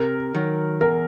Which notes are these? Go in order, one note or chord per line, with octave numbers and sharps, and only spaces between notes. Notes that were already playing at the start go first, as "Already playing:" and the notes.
Already playing: C3 A#4
D#3 F#3
E2 A#4